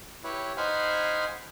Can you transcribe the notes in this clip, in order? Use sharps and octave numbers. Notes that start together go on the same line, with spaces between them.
E4 G4 B4 C#5
D#4 C5 F5 F#5 G#5 B5